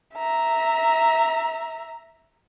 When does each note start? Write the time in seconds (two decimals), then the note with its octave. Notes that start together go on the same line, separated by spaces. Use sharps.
0.16 E5 A#5